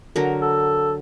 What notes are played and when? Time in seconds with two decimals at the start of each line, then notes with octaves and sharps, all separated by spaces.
0.16 D3 F#3 A#4
0.41 A4